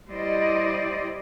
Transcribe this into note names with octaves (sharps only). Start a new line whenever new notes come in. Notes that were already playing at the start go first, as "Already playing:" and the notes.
G3 E4 C5 D5 D#5